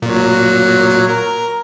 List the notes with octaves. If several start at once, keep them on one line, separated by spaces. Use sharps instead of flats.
A#2 F#3
A#4